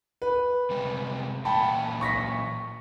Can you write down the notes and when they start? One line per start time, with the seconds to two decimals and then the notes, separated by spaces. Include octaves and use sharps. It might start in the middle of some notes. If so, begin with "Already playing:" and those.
0.22 B4
0.70 C3 G3 G#3
1.45 A#2 E3 F#5 G5 A5 B5
2.01 C#6 A#6 B6